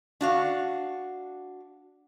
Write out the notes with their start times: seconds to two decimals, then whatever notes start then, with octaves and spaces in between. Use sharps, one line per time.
0.21 D4 F#4 F5